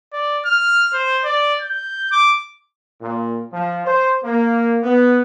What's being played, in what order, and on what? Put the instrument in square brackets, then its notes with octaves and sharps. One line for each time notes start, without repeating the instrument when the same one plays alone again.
[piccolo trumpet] D5
F6
C5
D5
G6
D6
[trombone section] A#2
F3
C5
A#3
B3